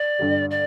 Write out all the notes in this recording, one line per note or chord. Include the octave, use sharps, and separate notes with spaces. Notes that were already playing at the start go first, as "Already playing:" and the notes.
Already playing: D5
G2 D3 G3
D5